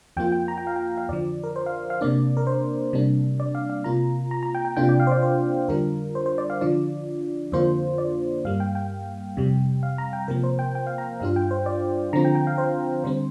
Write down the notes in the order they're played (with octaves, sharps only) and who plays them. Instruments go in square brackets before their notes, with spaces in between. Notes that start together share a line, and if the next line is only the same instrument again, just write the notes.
[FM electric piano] F2 F3 A#3 F4 G5
G5
A#5
G5
F5
G5
F5
F2 D3 F3 D5
A#4
C5
F5
F5
C3 A#3 D4 D5
A#4
C5
C3 G3 A#3 D4
D5
F5
F5
C3 A#3 F4 A#5
A#5
A#5
G5
G5
C3 A#3 D4 F4 G5
D5
F5
C5
D5
C5
F2 D3 G3 D4 F4 A#4
C5
C5
D5
F5
D3 F3 D4 F4 D5
F2 D3 A#3 D4 F4 C5
D5
G2 G3 A#3 F5
G5
G5
F2 C3 G3
F5
A#5
G5
C3 F3 A#3 A#4
C5
G5
G5
F5
A#5
G2 G3 D4 F4 F5
G5
C5
D5
D3 F3 C4 F4 A#5
G5
G5
F5
C5
D3 G3 C4 C5